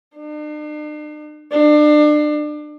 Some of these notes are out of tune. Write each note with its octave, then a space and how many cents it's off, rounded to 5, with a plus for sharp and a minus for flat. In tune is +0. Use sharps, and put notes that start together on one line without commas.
D4 +45
D4 +30